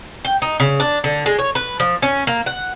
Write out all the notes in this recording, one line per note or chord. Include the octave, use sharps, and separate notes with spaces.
G5
D#4
C#3
D4
D3
G#3
C#5
B4
F3
C#4
A#3
F#5